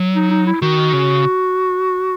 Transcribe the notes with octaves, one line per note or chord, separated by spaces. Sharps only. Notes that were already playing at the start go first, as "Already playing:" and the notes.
Already playing: F#3
D#4
D#4
E4
D#3 F#4
C#3